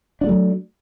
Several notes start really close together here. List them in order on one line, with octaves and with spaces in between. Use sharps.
D4 G3 A3 F#3